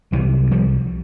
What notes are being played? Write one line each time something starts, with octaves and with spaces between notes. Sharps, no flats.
C2 C3 E3 F#3
F3 G3